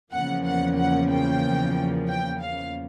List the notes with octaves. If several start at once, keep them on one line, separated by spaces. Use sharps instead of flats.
E2 C#3 F3 A#3 F#5
F#5
F#5
G5
G5
F5